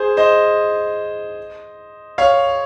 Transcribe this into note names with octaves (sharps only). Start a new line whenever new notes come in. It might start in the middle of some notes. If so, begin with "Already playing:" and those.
Already playing: G#4 C5
C5 D#5
C#5 F5